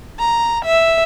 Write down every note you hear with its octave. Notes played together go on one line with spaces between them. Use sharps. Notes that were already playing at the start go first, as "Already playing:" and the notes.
A#5
E5